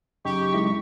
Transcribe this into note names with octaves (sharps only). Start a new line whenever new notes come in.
F#2 C#3 D#4 G4 C#6
G#3 E4 B6